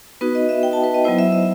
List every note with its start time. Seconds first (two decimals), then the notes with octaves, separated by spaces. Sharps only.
0.21 B3 D#4 F#4 B4
0.35 D#5
0.49 E5
0.63 G5
0.73 A5
0.83 B4
0.94 D#5
1.04 F#3 B3 E4 C5
1.19 E5
1.32 E5